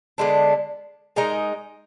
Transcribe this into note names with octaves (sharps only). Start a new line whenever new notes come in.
D3 G#3 B3 D4
G#3 D#4 A#4 D#5